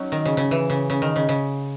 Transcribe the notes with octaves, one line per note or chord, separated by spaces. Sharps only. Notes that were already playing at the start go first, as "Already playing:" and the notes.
Already playing: F#3 C#4 D#4
D#3
C#3
C#3
E3
C#3
C#3
D#3
C#3
C#3